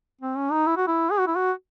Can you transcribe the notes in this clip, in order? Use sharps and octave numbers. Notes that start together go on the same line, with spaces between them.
C4
C#4
D#4
E4
F#4
E4
G#4
F#4
E4
F#4